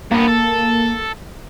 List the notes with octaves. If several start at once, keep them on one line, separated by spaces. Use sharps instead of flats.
G2 A#3 B3
A4